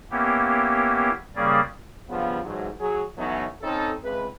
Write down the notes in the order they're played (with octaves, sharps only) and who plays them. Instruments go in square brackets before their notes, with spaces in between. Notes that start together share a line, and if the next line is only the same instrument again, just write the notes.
[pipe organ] A#3 B3 C#4 E4 G4
C#3 G3 A#3 C#4 G#4 D5
[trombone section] G2 C#3 F3 B3
A1 G#2 F#3
F#3 G#4
E3 F#3 A3 B3 C#4 D#4
C4 C#4 D#4 A4
C#2 C3 B4